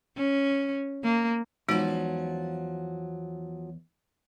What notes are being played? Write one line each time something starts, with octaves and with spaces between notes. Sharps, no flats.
C#4
A#3
E2 F3 F#3 G#3 D#4 F#4